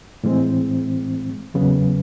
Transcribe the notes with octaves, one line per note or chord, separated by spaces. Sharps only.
A2 E3 G#3 C4
E2 C#3 F#3 B3